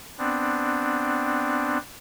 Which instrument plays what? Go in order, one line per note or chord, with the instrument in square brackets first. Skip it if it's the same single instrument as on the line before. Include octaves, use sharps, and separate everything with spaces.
[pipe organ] B3 C4 D4